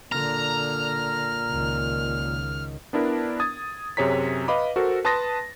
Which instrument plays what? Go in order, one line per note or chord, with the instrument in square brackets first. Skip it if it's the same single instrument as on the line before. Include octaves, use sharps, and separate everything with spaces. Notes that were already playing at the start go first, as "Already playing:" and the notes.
[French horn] A#2 [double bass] D3 [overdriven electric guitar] A#5 [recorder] F6
[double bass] C#2 D#3
[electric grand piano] B3 D4 E4 A#4
D#6 G#6 A6
F#2 C3 G#4 C#5 A#5 B6
B4 D#5 F5 B5 D6
F#4 A4 A#4 C5
B4 A5 C6 D#6 A6 A#6